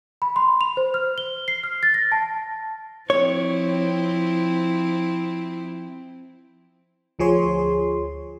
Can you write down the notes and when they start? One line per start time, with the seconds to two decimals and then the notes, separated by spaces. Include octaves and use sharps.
0.22 B5
0.36 C6
0.61 F7
0.77 C5
0.94 F6
1.18 G7
1.48 C7
1.64 F6
1.83 A6
1.94 A#6
2.12 A5
3.10 F3 C4 E4 C#5
7.19 D2 F3 G#4 C#5 C6